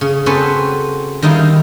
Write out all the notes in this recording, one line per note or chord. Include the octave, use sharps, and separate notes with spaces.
C#3
C4 C#4 F#4 A4 B4 C#5
D#3 G3 D#4 E4 F5